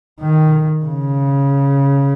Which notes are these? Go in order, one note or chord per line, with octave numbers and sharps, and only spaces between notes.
D#3
C#3